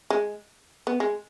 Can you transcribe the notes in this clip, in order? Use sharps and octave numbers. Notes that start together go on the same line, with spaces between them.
G#3
B3
G#3